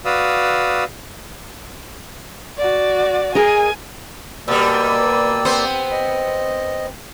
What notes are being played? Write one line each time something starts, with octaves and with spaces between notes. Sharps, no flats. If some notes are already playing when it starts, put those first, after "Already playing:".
F#4 B4 D5 F5 D#6 E6
F#4 D5
G#4 A#4 D#5 G#5
B2 G3 A#3 D5 E6
B3 C4 C5
D#5